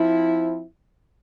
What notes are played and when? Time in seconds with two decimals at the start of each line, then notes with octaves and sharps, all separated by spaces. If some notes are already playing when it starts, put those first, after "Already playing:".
Already playing: F3 C4 E4